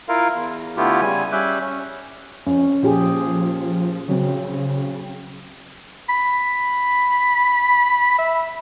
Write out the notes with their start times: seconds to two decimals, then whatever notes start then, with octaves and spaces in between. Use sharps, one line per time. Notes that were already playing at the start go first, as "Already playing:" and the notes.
0.09 E4 F4 A#4 F5
0.33 E2
0.77 D3 A3 B3 E4 F4 G4
1.01 C#3 G3 G#5
1.32 G3 C#4 E5 D6 F#6 G6
1.60 C#4
2.47 F2 C#4
2.83 A#2 F3 G4 G#4
4.08 C#3 F#3 C4
6.09 B5
8.18 E5